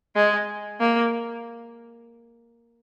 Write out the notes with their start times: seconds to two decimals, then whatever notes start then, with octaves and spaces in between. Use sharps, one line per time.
0.16 G#3
0.80 A#3